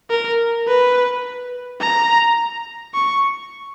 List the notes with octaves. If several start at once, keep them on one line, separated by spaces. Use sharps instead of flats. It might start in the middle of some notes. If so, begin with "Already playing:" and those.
A#4
B4
A#5
C#6